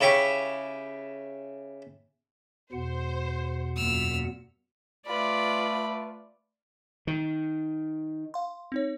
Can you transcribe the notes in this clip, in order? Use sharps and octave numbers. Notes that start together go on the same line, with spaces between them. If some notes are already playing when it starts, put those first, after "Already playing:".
C#3 E4 G4 C#6
E2 B2 C5 F#5
F#2 A#2 E6 F6
A3 F4 B4 D5 B5
D#3
F5 C6
C4 D#4 C#5